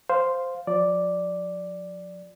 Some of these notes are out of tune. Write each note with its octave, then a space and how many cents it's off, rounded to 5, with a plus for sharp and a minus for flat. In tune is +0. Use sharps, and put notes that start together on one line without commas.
C5 +0 F5 +5
F3 +40 D5 +0